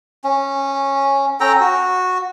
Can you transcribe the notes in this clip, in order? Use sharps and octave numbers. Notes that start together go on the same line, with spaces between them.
C#4
C#4 A4 G5 A#5
F#4